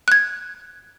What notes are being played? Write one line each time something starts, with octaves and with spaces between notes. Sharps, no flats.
F#6 G#6